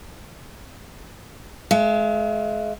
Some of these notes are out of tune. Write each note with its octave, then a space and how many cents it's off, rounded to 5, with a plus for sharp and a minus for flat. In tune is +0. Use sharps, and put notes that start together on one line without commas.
G#3 +35 F5 -45